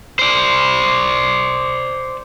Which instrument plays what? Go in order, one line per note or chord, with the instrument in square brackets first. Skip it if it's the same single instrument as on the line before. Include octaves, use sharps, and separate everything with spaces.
[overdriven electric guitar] C5 D5